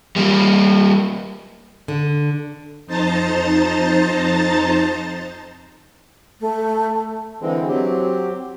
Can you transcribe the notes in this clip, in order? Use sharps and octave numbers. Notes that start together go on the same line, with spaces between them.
G3 A#3
D3
F2 D#4 C5 A5 A#5 A6
A3
D3 E3 G#3 C4
F#3 C4 G4